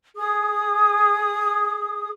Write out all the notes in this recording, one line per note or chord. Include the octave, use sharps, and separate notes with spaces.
G#4 D#6